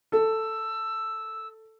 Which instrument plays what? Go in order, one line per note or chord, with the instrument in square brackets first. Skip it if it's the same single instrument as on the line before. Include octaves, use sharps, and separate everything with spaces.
[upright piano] A4 [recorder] E6